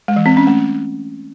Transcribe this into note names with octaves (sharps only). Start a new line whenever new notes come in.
G#3
E3
C4
C#4
A3